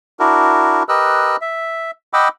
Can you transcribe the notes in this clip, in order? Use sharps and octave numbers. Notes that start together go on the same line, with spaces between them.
D4 E4 F#4 A#4
G4 A#4 B4 D#5 E6 F#6
E5
D#5 F#5 G5 B5 D6 E6